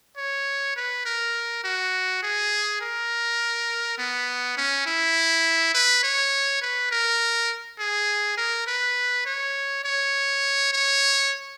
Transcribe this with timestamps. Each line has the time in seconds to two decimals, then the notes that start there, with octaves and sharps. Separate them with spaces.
0.17 C#5
0.76 B4
1.06 A#4
1.64 F#4
2.22 G#4
2.81 A#4
3.98 B3
4.57 C#4
4.86 E4
5.74 B4
6.03 C#5
6.61 B4
6.91 A#4
7.79 G#4
8.37 A#4
8.67 B4
9.26 C#5
9.84 C#5
10.73 C#5